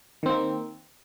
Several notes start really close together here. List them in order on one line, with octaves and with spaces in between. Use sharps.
D#3 C4 A#3